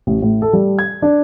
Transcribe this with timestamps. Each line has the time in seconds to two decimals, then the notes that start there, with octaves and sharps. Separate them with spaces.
0.07 A1
0.22 A2
0.42 A4
0.53 G3
0.79 G#6
1.02 D4